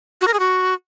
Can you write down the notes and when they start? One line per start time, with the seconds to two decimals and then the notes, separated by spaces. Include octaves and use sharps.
0.21 F#4
0.27 A#4
0.34 G#4
0.40 F#4